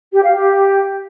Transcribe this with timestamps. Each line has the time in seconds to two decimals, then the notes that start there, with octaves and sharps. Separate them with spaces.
0.13 G4
0.24 F5
0.34 G4